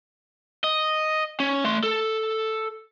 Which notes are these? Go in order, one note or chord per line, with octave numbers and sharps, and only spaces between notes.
D#5
C#4
A3 C6
A4